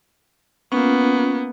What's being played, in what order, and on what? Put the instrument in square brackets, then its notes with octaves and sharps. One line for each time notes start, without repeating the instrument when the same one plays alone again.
[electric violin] A#3 B3 [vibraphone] C#4 F4